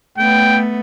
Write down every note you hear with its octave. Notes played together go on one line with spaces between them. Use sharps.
A3 B3 G5